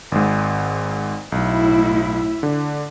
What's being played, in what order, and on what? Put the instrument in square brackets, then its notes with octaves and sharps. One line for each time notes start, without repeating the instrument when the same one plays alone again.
[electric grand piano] G#1 G#2
[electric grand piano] B1 [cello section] A2 E4
[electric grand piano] D3